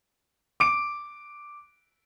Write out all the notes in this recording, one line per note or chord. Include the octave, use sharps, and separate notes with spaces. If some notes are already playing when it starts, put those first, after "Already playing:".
D6 D7